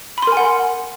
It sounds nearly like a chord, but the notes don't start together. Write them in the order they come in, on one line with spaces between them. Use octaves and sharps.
B5 C6 A#4 G#5 F#5